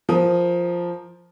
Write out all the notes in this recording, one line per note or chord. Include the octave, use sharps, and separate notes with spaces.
F3 A#4 D#6